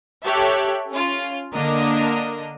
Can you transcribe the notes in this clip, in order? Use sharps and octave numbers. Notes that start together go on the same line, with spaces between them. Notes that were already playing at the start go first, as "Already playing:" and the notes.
G4 A4 C#5 E5 G5 F#6
C#4 F4
D3 A#3 D4 A#4 D#5